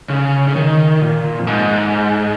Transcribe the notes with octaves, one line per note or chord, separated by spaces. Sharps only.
C#3
C#3
D#3
A#2
F2
G#2